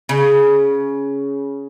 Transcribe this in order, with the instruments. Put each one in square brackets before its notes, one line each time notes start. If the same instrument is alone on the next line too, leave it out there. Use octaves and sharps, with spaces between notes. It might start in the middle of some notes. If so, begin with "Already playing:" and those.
[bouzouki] C#3